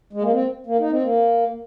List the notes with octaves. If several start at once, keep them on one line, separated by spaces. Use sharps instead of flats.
G#3
A#3
C4
A#3
D#4
C4
A#3